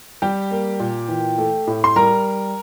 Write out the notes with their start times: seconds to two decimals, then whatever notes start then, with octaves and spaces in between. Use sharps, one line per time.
0.22 G3 G4 G5
0.51 A#3
0.80 A#2
1.08 E3
1.38 A3
1.67 A2
1.84 C6
1.96 G3 A#4 A#5